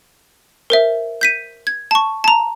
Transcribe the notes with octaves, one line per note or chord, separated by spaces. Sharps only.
A#4 C5 E5
G6 B6 D#7
G#6
A5 C#6
A5 A#5